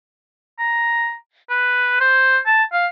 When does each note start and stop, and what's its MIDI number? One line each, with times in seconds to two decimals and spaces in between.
0.59 1.15 82
1.50 1.98 71
2.01 2.38 72
2.47 2.64 81
2.73 2.87 77